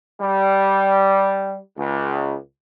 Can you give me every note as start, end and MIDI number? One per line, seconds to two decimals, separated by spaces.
0.21 1.57 55
1.77 2.35 37